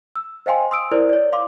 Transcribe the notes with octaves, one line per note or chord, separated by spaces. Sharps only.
E6
C5 D#5 F5 G5 G#5 C6
C6 D#6 E6 D7
E4 A#4 C5 D5
C#5 D5
F5 C6 D6